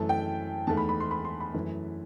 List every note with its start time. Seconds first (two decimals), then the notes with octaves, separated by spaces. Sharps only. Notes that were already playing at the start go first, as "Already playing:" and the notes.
Already playing: F#2 E3 A3 A5
0.09 G5
0.67 E2 D#3 A3 A5
0.77 B5
0.89 B5
1.00 C6
1.11 B5
1.25 C6
1.40 B5
1.54 F#2 E3 A3